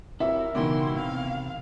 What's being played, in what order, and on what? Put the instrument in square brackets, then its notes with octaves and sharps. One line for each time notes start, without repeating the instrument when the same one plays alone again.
[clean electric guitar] E4 G4 C#5 [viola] A#4 [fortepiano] E5
[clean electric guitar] C#2 F#4 D5 [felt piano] B2 D#3 E3 [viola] E4 C6
[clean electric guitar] C3 [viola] F5